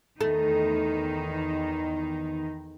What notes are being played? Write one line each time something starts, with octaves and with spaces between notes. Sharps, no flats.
E2 D#3 A3 D#4